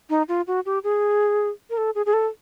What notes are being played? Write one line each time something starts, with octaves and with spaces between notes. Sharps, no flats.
D#4
F4
F#4
G4
G#4
A#4
A4
G#4
G#4
A4